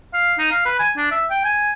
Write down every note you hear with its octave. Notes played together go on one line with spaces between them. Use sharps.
F5
D#4
F5
B4
G#5
D4
E5
G5
G#5